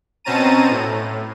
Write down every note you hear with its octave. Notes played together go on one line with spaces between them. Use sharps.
B2 C4 C#4 A5 A#5 D#7
A2